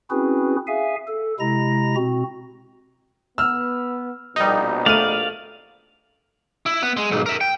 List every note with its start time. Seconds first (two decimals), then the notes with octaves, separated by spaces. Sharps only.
0.11 C4 C#4 E4 F#4 G#4 B4
0.67 G#4 E5 F5 G#5
1.07 A4
1.40 C3 G#3 E4 A#5 A#6
1.96 B2 C4 F#4
3.38 B3 E6 F6
4.36 A#1 B2 G3 D#4
4.86 A3 D5 F5 F6 D#7
6.66 E4
6.83 B3
6.97 G#3
7.11 B1 G#2
7.26 A#4 E5
7.41 G5